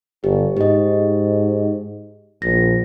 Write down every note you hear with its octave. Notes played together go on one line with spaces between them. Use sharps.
G1 G4
G#2 G4 D#5
A#1 A#6